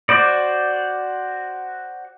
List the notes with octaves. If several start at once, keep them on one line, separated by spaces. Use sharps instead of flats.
F#4 C5 D5